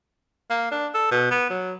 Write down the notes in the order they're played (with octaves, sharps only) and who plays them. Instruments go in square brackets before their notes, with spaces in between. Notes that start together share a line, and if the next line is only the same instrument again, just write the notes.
[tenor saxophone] A#3
D4
A4
B2
B3
F#3